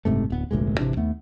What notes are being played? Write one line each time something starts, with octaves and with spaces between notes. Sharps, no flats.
F#1 G#2 C3 A3
D1 B3
F1 D2 A#2 G#3
G#1 C3 E3 D4
D#2 A3 B3